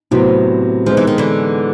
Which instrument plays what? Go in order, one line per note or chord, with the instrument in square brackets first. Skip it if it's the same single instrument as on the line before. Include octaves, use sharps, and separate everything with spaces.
[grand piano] A2 F#3 B3 [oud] C3
[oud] F3 [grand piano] G#3 B3 D#4
[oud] E3
D#3
D3 E3